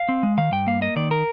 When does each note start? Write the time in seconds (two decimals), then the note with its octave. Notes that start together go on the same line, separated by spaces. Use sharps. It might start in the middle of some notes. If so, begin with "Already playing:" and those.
Already playing: F5
0.09 C4
0.23 G#3
0.38 D#3 F5
0.52 G2 G5
0.67 A#3 F5
0.81 A#3 D#5
0.96 D#3 D5
1.11 A#4